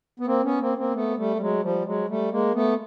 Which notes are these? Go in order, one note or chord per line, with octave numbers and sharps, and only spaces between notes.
B3
A#3 C4
B3 C#4
A#3 C4
A#3 C4
A3 B3
G3 A3
G3
F#3 G#3
F3 G3
F#3 G#3
G3 A3
G#3 A#3
A3 B3